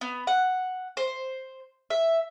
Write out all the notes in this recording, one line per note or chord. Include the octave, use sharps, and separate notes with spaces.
B3
F#5
C5
E5